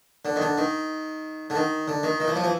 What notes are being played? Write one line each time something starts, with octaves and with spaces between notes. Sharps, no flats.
D3
D#3
D3
D#3
D3
D#3
D3
D#3
D#3
E3
F3
E3